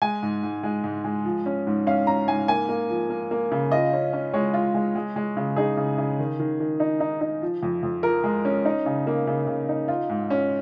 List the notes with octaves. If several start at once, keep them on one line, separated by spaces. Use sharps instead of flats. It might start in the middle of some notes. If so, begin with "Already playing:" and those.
G#3 G#5
G#2
G#2
G#3
G#2
G#3
F3
C#4
G#2
C#4 F5
C#4 A#5
G#2 G#5
A#3 G#5
A#3
F3
A#3
A#3
C#3
F4 D#5
C#4
C#4
G#3 C#5
F4
G#3
G#3
G#3
C#3
D#4 G#4
C#3
C#3
D#3
D#3
D#3
D#4
D#4
D#4
F3
F2
F2
F3 A#4
G#3
C#4
D#4
C#3
A#3
C#3
C#3
D#4
F4
G#2
C#4